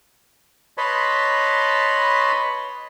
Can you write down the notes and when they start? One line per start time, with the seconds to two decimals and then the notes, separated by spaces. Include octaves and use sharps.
0.78 B4 C#5 D#5 A5 B5 C6